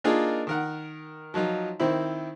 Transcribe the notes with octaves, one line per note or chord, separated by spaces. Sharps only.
A#3 D4 D#4 F4 G#4 A#4
D#3 A#4 F#5
F3 F#3 D#4 F4
D#3 C4 E4